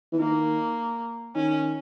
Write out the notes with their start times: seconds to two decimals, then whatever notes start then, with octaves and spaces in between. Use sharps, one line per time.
0.12 E3
0.20 D#3 A#3
1.36 D#3 C#4